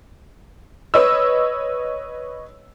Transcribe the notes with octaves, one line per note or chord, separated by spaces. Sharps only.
B4 C#5 D#5 E6